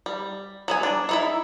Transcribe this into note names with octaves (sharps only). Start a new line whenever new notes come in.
G3
F#3 B3 G#5
D4
D#4 E4 E5